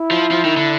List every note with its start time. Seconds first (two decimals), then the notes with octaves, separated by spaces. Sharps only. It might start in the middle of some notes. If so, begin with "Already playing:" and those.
Already playing: E4
0.11 F3
0.31 F3
0.44 D#3
0.57 D3